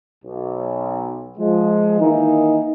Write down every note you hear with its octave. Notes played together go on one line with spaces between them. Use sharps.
B1
F3 G#3
D#3 E3 A#3 D#4